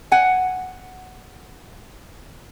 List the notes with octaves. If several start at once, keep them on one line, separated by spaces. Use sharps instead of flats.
F#5 G#5